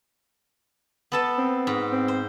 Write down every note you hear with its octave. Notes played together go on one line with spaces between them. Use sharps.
B3 A4 A5
C4
G#2
C4
C5